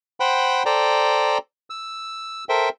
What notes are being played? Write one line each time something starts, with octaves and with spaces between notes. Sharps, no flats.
C5 F#5 G5 B5
A4 C5 D5 G5 A#5
E6
A4 A#4 C5 E5 G5